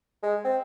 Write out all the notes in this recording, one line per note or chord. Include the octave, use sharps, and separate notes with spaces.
G#3
C4